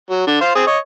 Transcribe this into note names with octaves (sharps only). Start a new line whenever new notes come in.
F#3
D3
C5 F5
C4 G#4
C#5 D#5